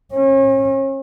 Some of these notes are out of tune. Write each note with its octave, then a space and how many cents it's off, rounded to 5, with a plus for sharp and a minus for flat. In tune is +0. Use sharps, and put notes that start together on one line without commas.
C#4 -40